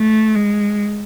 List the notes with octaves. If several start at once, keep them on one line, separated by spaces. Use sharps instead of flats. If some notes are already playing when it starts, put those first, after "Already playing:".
Already playing: A3
G#3